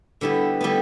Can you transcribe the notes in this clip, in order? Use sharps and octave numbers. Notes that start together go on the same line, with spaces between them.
D3 G3 B3 E4 G4
D3 G3 B3 E4 G4